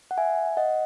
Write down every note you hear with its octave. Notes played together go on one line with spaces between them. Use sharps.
F#5
E5 G#5
D#5 F#5